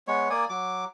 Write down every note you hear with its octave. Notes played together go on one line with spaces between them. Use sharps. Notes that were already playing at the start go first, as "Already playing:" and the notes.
G#3 B3 C#5
A#3 D5 G#5 D#6
F#3 D6